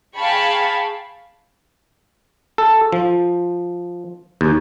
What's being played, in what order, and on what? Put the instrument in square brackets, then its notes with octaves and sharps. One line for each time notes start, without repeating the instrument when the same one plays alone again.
[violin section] G#4 F5 G5 A5 B5 C#6
[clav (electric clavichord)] A4
F3
D#2